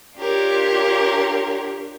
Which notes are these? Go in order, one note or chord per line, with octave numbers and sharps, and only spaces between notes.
D4 F4 G4 A#4 C#5